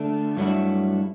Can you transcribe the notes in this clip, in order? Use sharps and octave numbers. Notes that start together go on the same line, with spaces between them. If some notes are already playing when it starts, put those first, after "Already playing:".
Already playing: D3 A3 D4
G2 F#3 A3 E4